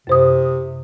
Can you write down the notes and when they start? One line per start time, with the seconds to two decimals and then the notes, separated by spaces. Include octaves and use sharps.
0.07 F#2 C3 C5 D#6